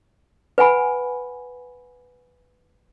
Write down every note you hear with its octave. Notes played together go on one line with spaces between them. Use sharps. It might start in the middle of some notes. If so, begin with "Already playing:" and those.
B4 F#5 G#5 B5